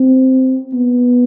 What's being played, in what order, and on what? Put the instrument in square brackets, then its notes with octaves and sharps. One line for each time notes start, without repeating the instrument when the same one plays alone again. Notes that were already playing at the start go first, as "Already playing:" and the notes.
Already playing: [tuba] C4
B3